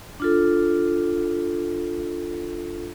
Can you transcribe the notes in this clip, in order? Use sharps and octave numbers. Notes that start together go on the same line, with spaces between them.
D4 F4 A4